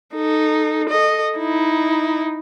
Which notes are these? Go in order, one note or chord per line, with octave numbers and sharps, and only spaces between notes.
D#4 A4
A4 D#5
D#4 E4